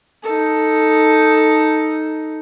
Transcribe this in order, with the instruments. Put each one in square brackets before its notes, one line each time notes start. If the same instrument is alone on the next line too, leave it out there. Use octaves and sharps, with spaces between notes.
[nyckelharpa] D#4 A4